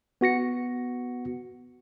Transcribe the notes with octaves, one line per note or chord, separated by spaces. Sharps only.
B3 F#4 A#6 C#7